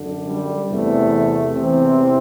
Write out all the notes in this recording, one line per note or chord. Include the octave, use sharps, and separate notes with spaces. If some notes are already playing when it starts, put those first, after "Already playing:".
Already playing: F#2 D3
G3
E2 C3 E3 A3
E2 C3 E3 C4